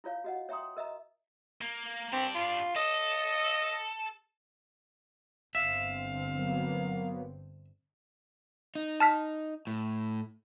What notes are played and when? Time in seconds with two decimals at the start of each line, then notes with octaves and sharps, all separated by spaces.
0.04 E4 F4 C#5 F5
0.24 F#4 D#5 F#5
0.49 C#5 E5 G5 A#5 C6 D#6
0.77 A#4 D#5 E5 A#5
1.62 A#3
2.13 C4 D4 G4
2.35 F4
2.76 A4 D#5
5.55 G1 D3 C4 E5 F5
6.37 F#3 A#3 B3
8.75 D#4
9.00 A5 F6 B6
9.67 A2